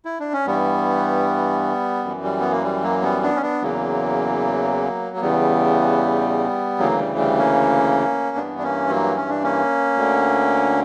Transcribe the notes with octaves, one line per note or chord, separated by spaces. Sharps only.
E4
D4
C#4
G2 E3 G3 B3
F#2 E3
G3
B3
A#3
G3
F#3 A#3
G3 B3
B3 D4
C#4
B3 D4
E2 C#3 E3 F#3 A#3
A#3
E2 C#3 E3 G3 B3
D2 C#3 E3 F#3 A#3
G3
G3
A#3 C#4
G2 E3 B3 D4
D4
A#3 C#4
F#3 A#3
C#4
D4
A#3 C#4
D2 D3